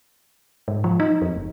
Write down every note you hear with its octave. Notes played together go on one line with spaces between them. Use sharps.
G#2
F3
D#4
F2
F#1